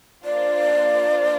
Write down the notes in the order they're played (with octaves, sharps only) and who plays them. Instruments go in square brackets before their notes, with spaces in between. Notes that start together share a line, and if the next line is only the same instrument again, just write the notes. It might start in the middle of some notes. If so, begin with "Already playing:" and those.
[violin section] A#3 D4 F4 C5 [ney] D5